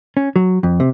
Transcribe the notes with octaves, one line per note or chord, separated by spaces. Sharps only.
C#4
F#3
F2
C3